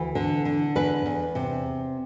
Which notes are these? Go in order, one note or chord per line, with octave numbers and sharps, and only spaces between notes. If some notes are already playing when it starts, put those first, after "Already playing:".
Already playing: D2 E3
D3
D3
E2 B4
E2
C3